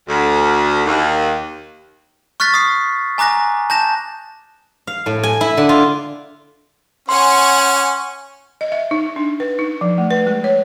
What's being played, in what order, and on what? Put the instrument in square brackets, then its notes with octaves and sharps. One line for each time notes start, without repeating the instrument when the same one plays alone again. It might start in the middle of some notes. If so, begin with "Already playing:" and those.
[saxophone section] D2
D#2
[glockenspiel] C#6 F6 F#6 A6 B6
D#6 C7
G#5 A#5 D6 F#6 A#6
A5 G6 A#6 E7
[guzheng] F5
A2
G#5
E4
D3
F4
[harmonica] C#4 [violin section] F#5 G#5 C#6 [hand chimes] C6
[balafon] D#5
E5
D#4
D4
B4
D#4
F3
A3
B4
G#3
C#5